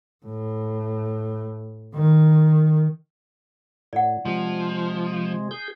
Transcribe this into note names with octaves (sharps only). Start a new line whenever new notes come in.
A2
D#3
A2 D5 F#5
C3 F3 G#3
G#4 G6